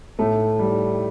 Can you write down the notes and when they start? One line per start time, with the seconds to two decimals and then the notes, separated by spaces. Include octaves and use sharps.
0.19 A2 A3
0.59 G3